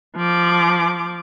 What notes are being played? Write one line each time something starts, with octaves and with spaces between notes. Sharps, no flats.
F3 D6